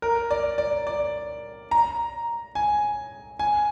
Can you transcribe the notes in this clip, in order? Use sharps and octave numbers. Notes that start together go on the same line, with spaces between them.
A#4
D5
D5
D5
A#5
G#5
G#5